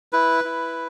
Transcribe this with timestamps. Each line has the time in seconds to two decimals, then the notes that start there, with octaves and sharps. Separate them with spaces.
0.13 E4 B4
0.44 E4